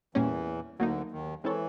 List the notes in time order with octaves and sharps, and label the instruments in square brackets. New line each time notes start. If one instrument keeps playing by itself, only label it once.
[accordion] E2 E3 [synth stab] A#2 G3 A#3 C#4
[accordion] D2 D3 [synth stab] F#3 A#3 D#4
[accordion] D#2 D#3
[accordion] E3 [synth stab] G#3 C4 E4 A4 C#5